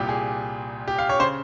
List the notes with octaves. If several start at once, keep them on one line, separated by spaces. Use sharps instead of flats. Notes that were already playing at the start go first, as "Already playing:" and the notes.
Already playing: C2 A#2 G4
G#4
G4
F5
C#5
C#3 C5